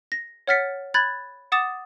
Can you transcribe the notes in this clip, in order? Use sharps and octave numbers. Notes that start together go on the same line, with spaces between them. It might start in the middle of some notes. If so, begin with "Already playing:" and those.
A#6
C#5 F#5 F6 A6 B6 C#7
B5 F#6 G#6 A6
F#5 D6 D#6 A6 E7